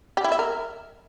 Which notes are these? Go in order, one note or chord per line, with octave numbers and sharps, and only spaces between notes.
G4
E4
E5
A#4